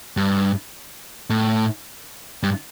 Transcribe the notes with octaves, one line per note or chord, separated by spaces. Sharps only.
G2
A2
G2